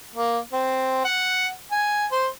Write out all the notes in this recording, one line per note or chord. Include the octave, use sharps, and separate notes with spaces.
A#3
C4
F#5
G#5
C5